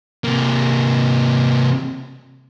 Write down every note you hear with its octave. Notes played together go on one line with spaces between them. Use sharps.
C3 A#3